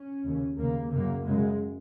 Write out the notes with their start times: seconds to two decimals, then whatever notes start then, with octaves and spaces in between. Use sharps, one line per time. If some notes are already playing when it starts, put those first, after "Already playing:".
Already playing: C#4
0.26 D#2 C#3
0.58 D#2 C#3 A#3
0.91 F#2 C#3 A#3
1.24 F#2 C#3 G#3